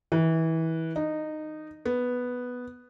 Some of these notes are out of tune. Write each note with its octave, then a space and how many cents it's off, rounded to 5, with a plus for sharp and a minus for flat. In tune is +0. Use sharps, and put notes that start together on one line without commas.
E3 -25
D#4 -15
B3 +0